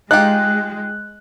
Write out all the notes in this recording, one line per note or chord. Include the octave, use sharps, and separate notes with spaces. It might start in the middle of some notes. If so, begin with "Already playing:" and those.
G#3 D#4 F4 G4 F#6